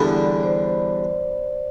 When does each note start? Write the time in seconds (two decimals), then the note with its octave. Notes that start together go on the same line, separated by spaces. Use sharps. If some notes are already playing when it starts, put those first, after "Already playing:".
Already playing: E2 D3 G3 B3
0.16 D5
0.40 D5
0.43 C5